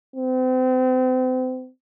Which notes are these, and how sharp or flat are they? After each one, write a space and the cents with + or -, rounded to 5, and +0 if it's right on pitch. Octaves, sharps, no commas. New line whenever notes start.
C4 -35